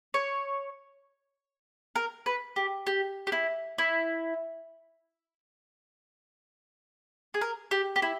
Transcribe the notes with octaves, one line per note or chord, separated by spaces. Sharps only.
C#5
A#4
B4
G4
G4
G4
E4
E4
G#4
A#4
G4
G4
E4